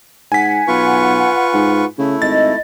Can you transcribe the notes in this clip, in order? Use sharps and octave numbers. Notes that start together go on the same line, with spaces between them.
G#2 F#5 G#5 B6
B1 F4 B4 C#6
G#2
C#3 A3 E4
G#1 D#5 A6